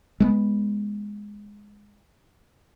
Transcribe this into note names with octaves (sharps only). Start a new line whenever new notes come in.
G#3 A3 B3